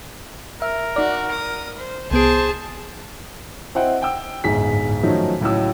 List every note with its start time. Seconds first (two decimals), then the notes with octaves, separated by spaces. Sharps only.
0.62 A#4 E5
0.96 D#4 F#4 D5
1.32 D#6
1.78 C5
2.11 C2 B3 G#4 C5 A5 D7
3.75 C4 E4 C5 D#5 F#5 G5
4.02 G5 E6
4.44 D1 G1 G#2 G#4 B6
5.03 D#3 F3 F#3 A3 C#4 D#4
5.41 C#2 A2 F#3 C#5 E6